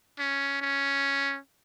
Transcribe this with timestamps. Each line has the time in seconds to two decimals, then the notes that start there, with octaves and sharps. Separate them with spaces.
0.19 C#4
0.61 C#4